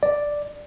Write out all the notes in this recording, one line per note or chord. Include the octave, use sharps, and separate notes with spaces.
D5